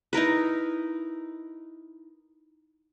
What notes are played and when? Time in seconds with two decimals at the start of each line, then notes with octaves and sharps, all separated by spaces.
0.13 D#4 E4 A#4 B4